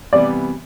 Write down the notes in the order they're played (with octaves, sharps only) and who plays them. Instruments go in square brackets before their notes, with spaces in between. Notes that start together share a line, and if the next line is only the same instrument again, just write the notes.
[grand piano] C3 E3 G3 B3 [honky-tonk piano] D5